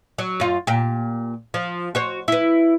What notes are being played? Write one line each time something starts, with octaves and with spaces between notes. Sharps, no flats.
F#3
F#2 F4
A#2 G4
F3
F#4 C5 C#5
E4 B4